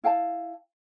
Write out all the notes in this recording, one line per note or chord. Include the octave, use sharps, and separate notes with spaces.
E4 F5 G5 A5